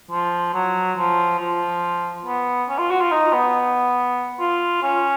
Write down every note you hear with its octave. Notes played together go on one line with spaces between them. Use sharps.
F3
F#3
F3
F3
B3
C#4
F4
F#4
F4
D#4
B3
F4
C#4